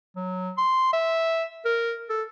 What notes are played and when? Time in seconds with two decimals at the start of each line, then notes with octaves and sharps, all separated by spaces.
0.16 F#3
0.57 C6
0.93 E5
1.65 A#4
2.09 A4